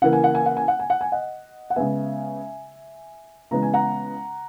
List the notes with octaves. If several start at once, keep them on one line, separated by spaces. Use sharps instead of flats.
C#3 E3 A#3 F#5
G#5
F#5
G#5
F#5
G#5
F#5
G#5
F#5
G#5
D#5 F#5
F#5
C#3 G#3 B3 E5 G#5
C#3 E3 G#3 B3 A#5
G#5
F#5 A#5